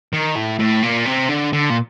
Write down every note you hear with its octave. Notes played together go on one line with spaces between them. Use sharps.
D#3
A2
A2
A#2
C3
D3
D3
A#2